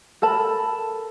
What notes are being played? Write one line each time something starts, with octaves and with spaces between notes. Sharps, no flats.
A4 A#4 A5 B5